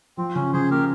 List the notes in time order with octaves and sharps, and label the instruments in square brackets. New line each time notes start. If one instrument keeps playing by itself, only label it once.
[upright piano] F3 [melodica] C4
[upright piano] C#3 [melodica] C#4
[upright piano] C#3 [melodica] G#4 C5
[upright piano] A#3 [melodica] G4 A#4